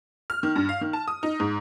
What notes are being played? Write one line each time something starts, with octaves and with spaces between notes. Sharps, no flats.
F6
D#3
G2
F5
D#3
A5
D#6
D#4
G#2